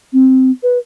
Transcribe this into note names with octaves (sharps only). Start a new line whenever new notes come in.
C4
B4